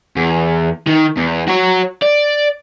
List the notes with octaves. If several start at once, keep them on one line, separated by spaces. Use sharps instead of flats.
E2
D#3
E2
F#4 C#5
D5